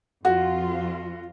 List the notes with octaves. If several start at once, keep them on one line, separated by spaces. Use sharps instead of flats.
F2 F4 F#4